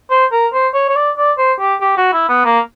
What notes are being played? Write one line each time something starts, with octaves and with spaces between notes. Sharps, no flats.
C5
A#4
C5
C#5
C#5
D5
D5
C5
G4
G4
F#4
E4
B3
A#3